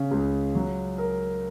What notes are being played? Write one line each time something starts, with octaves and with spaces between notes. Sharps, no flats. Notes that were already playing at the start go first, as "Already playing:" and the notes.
Already playing: C#3
C#2
F#3
A#4